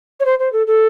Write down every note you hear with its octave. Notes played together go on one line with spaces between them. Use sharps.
C#5
C5
C5
A4
A4